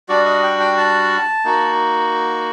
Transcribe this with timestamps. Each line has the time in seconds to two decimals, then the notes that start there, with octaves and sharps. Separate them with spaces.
0.09 G3 D4 F#4 D5
0.26 D#5
0.43 G5
0.60 G5
0.77 A5
1.44 A#3 D#4 F#4